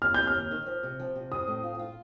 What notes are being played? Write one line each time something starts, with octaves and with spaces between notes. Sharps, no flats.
D#2 F6
D#2 G6
F6
D#2
D#3
F3
C3
F3
C3
C4 D#6
A2
F4
F4